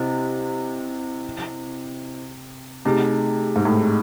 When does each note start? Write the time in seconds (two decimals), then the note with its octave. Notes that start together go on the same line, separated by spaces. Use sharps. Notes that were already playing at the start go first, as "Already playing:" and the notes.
Already playing: C3 C4 E4 C5 D#5
2.85 C3 A3 D#4 G#4
3.56 G#2
3.65 A2